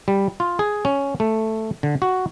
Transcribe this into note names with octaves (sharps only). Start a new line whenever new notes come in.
G3
F4
G#4
C#4
A3
D3
F#4